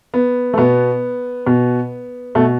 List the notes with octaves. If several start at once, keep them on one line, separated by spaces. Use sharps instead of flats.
B3
A3
B2 B3
B2
B2 A3